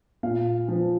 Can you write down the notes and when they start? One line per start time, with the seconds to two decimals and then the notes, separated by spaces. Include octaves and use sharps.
0.23 A#2 F5
0.68 F3